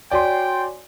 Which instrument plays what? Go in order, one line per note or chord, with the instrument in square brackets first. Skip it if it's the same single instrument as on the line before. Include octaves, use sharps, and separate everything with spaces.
[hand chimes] F#4 C#5 G#5 [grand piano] D5 C6 [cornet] G5